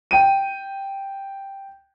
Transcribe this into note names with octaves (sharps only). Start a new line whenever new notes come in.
G5 D#7